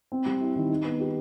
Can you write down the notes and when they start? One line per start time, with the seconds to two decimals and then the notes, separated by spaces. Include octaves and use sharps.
0.12 C4
0.26 G3
0.41 E4
0.56 D#3
0.70 D#4
0.84 B3
1.00 G4